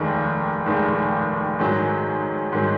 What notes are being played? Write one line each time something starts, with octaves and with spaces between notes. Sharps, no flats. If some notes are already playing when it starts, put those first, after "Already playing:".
Already playing: F1 D#2 D#3 G#3
F1 D#2 D#3 G#3
G#2 D#3 F#3
G#2 D#3 F#3